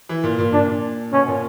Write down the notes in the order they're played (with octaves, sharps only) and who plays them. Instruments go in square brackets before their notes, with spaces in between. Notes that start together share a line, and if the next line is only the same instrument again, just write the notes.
[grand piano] E3
A#2
A#2
[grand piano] A#2 [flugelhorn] D4
[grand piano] B2 [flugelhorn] C#4
[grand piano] A#2